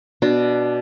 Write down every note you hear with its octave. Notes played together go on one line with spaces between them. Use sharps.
B2 D4